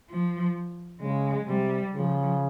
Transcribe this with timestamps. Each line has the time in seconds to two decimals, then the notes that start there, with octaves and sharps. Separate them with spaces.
0.10 F3
1.02 C#3 G#3
1.47 C3 G3
1.94 C#3 F3